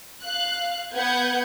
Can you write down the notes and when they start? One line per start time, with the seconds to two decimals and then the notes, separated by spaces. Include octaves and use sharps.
0.23 F5 F#6
0.94 B3 B4 F#5 G6 G#6